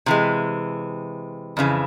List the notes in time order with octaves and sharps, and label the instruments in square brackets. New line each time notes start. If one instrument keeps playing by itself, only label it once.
[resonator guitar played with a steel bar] C3 E3 G#3
F2 C#3 E3